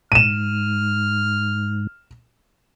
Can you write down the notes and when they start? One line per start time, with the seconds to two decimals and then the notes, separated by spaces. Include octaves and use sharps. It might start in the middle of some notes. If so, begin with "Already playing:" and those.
0.12 G#2 F6 D#7 E7